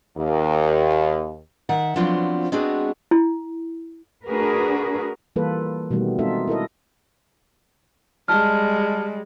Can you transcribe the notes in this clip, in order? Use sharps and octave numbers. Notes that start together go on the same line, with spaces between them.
D#2
D#3 E5 F#5
F3 F#3 B3 C4 D4 F4
G#3 B3 C4 D4 F#4 G#4
E4
A3 D4 F#4 G#4 A#4 B4
E3 G3 A#3 F4 A4 B4
B2 D#3 G3 A3 B3
G#3 C4 D#4 F4 A4 E5
E4 A4 A#4 D#5
G3 G#3 A5 F6